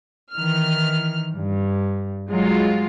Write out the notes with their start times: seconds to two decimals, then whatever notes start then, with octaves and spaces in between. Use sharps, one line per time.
0.33 D#3 E3 F6
1.34 G2
2.31 F#3 G#3 F4